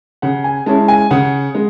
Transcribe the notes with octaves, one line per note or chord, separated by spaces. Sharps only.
C#3 F#5
G#5
G#3 C#4 E4 A5
G#5
C#3 F#5
G#3